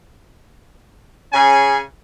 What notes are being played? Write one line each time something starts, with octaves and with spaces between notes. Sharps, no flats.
C#3 C#4 G#4 G#5